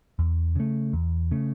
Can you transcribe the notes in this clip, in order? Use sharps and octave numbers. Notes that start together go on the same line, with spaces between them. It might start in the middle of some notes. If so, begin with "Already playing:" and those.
E2
C#3 A3
E2
C#3 A3